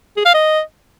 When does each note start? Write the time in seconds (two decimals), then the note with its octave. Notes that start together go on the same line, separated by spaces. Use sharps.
0.17 G#4
0.26 F5
0.35 D#5